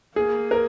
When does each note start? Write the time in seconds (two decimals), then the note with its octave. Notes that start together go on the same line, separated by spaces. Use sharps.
0.16 A#3 G#4
0.51 A#4